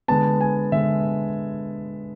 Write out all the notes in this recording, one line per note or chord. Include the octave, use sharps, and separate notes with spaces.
D3 G#3 B3 A5
G#5
D3 G#3 B3 E5